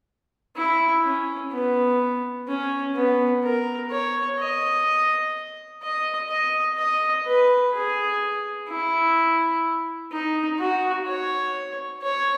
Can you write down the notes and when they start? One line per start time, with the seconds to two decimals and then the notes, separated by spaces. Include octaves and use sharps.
0.56 E4
1.05 C#4
1.52 B3
2.48 C#4
2.95 B3
3.44 A#4
3.91 C#5
4.39 D#5
5.83 D#5
6.29 D#5
6.78 D#5
7.26 B4
7.73 G#4
8.69 E4
10.12 D#4
10.59 F#4
11.07 C#5
12.03 C#5